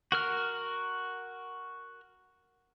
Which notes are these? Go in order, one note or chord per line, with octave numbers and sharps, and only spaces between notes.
F#4 A#4 F6